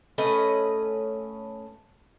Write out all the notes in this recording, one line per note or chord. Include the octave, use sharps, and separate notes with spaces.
A3 C#4 B4 D#5